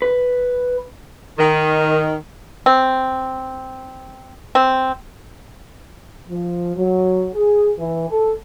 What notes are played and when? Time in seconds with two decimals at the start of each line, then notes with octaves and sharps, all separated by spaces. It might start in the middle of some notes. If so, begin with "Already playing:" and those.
0.02 B4
1.38 D#3
2.66 C4
4.55 C4
6.30 F3
6.76 F#3
7.35 G#4
7.78 E3
8.10 A4